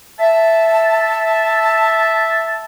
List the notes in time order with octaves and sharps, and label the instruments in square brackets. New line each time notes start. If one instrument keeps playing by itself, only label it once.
[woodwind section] E5 A5